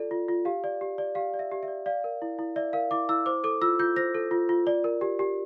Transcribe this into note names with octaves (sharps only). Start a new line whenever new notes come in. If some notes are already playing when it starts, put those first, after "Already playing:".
Already playing: F4 A4 D5
F4
F4
G4 F5
D5
G4
D5
G4 F5
D5
E5
G4
E5
D5
D5 F5
A#4
E4
E4
D5 E5
A#4 F5
E4 D6
E4 E6
C5 D6
A4 D6
F4 E6
F4 G6
C5 A#6
A4
F4
F4
D5
A#4
G4
G4